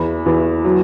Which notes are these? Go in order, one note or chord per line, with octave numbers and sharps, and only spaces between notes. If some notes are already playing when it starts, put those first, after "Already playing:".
Already playing: E2 B5
E2
F#3